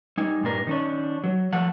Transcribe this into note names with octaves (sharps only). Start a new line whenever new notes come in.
G3 D#4 G#5
G2 A#2 D4 A#4
D#3 C#4 D4
F#3
F3 A3 F#5 A5